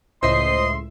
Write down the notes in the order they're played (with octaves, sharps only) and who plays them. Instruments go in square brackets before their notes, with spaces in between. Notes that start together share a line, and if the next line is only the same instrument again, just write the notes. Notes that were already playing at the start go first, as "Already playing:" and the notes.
[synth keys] C#2 A2 E5 [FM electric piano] C5 D#6 C7 [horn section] D#5 [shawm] C6